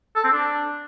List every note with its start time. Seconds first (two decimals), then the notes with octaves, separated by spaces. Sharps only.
0.16 A4
0.24 C4
0.32 D4